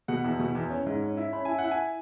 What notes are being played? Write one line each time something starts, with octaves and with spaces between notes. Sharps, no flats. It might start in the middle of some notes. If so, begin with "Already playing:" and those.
B2 F#5
E2
B2
E2
C#4
G#2
C#4
E4
C#4 B5
E4 G#5
F#5
E4
G#5